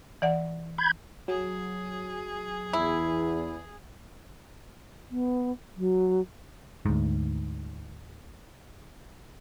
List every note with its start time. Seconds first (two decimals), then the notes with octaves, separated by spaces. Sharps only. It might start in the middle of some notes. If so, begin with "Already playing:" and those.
0.22 E3 D5 F#5
0.78 B5 G6 G#6
1.28 F#3 G#4
2.73 E2 E4
5.11 B3
5.76 F#3
6.86 D2 G#2